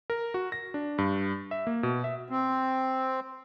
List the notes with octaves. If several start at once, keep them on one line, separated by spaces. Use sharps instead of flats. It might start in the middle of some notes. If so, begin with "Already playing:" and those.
A#4
F#4
A#6
D4
G2
E5
A#3
B2
E5
C4